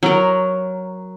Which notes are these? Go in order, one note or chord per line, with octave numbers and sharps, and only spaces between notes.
F#3 A#4